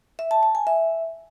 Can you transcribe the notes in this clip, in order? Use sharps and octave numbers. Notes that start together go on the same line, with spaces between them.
E5
A5
A5
G#5
E5